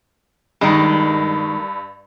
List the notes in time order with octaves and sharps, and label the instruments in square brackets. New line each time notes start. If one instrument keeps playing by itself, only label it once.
[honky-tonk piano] G2 [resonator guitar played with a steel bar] D#3 G#3